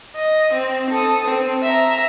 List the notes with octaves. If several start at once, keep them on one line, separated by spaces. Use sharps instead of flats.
D#5
C4
A4 D#6
C4
E5 A#5